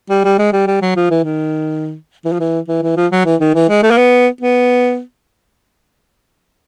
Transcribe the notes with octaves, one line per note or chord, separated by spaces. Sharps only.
G3
G3
G#3
G3
G3
F#3
F3
E3
D#3
E3
F3
E3
E3
E3
F3
F#3
E3
D#3
E3
G#3
A3
A#3
B3
B3